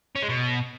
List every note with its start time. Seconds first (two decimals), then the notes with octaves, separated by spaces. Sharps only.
0.16 C#4
0.22 G#3
0.29 B2